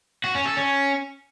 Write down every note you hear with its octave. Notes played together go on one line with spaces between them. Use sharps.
F#4
C#4
A4
C#4